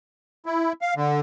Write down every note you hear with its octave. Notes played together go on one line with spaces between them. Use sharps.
E4
F5
D3